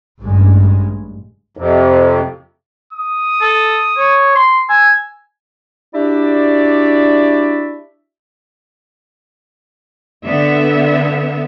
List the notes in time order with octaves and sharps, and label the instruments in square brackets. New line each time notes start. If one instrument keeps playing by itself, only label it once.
[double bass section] A1 G2 C#3 G#3
[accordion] F2 C3
[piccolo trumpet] D#6
[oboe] A4
C#5
C6
[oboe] G#5 [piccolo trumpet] E6
[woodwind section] D4 E4 F#4 G4 D5 E5
[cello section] D3 B3 E5